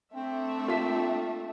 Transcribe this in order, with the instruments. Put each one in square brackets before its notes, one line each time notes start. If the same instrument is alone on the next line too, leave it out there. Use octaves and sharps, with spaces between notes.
[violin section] A3 D4 E5 [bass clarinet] C4
[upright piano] A#3 F4 B6